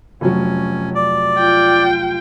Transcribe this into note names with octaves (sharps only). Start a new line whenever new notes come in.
F1 F#3 C#4
D5
F4 G5